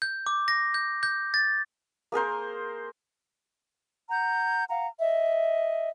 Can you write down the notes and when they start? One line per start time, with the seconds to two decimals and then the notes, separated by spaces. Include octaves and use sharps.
0.02 G6
0.26 D6
0.48 A#6
0.74 G6
1.03 G6
1.34 A6
2.12 A#3 G#4 A#4 C5
4.10 F#5 A#5 G6
4.69 F5 F#5 A#5
4.99 D#5 E5